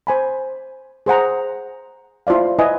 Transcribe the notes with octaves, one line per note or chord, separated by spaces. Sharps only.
C5 G#5 B5
G#4 C5 F#5 A#5
E4 F4 C5 D5 F5
E4 B4 D#5 G#5